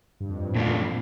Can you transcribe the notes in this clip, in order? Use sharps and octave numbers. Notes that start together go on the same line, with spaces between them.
G2
F2
G2
A2
G2 A#2 A3 D4 F4
F2